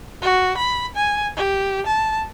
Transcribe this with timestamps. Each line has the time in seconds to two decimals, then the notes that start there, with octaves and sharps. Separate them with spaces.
0.22 F#4
0.57 B5
0.96 G#5
1.37 G4
1.87 A5